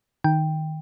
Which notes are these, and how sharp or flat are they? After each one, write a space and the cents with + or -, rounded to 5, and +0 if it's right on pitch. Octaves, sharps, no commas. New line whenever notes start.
D#3 +0 G5 +5